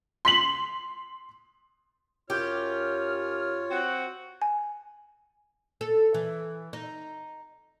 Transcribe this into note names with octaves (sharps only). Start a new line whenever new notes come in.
C6 B6 F#7
F#2 F4 G4 C#5 F6
C4 F#4
G#5
A4
E3
D#4